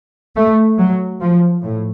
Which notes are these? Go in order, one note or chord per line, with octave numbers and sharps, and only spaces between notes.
A3
F#3
F3
A2